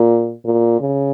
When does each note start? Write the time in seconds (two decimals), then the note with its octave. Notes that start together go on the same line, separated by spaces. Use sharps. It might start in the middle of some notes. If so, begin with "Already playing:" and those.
Already playing: A#2
0.45 A#2
0.81 C#3